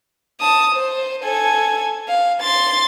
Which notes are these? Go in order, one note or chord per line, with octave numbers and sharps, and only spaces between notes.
A5 D#6
C5
A4 G#5
F5
C6 A6